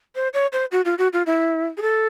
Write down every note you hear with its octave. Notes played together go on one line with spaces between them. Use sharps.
C5
C#5
C5
F#4
F4
F#4
F4
E4
G#4
A4